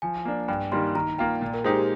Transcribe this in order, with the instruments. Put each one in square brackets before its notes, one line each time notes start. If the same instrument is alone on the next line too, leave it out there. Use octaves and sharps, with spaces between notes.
[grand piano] F3 [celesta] G#5
[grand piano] A#3 D4
[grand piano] G2 [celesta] G5
[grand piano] D#3 G3 A#3 [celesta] C6
[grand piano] D#3 [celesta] A#5
[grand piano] A#3 F4 [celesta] G5
[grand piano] A#2
[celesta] A#4
[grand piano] G#3 D#4 G4 [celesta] C5
[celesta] G4